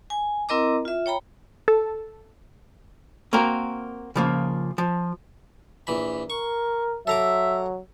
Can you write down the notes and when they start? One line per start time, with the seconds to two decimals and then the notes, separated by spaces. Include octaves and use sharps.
0.10 G#5
0.49 C4 E4 A#4 D#5 A#5 D6
0.85 F4 E5
1.06 C#5 G5 A#5 B5
1.68 A4
3.33 A#3 C4 F#4 A#4
4.16 C#3 F3 A#3
4.78 F3
5.87 A#1 E3 B5
6.30 A#4 C#6
7.07 F#3 A4 E5 A#5 D6